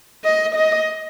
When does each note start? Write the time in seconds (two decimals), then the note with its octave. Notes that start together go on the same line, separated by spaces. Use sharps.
0.24 D#5
0.55 D#5